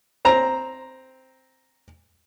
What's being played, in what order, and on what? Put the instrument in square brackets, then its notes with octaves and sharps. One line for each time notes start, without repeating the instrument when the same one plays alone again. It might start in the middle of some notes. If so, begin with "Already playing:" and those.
[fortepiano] C4 A#5